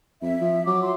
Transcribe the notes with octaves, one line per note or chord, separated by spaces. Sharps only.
F2 E5
F3
F#3 D6
C6